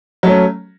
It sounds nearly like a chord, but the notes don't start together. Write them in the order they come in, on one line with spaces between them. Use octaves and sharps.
F#3 A3 C#4